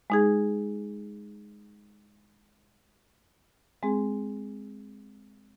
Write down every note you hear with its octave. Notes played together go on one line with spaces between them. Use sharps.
G#3 D#4 G#4
G#3 C4 G#4